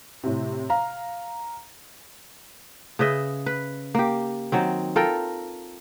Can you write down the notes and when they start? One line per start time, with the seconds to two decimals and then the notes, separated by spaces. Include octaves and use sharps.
0.24 A2 C3
0.70 F5 A#5
2.99 C#3 B4 D#5 E5
3.46 B4
3.95 A#3 G4
4.52 D#3 F#3 C4
4.96 F4 A4 A#4 G5